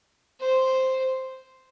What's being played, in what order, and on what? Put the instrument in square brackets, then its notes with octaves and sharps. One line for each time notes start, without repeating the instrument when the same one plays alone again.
[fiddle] C5